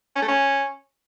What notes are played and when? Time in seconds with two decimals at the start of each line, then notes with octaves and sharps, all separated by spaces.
0.15 C#4
0.22 A3
0.28 C#4